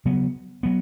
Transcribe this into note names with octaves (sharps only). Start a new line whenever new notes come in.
C#3 F#3 B3
F#3 B3